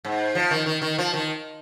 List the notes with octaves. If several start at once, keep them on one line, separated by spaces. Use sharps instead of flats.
G#2
F3
D#3
D#3
D#3
F3
D#3